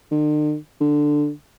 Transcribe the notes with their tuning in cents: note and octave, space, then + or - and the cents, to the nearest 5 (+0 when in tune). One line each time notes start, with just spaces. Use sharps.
D3 +45
D3 +10